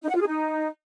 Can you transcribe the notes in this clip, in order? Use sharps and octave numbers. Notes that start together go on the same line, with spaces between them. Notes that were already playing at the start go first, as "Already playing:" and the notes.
D#4
F#5
F4
G#4
D#4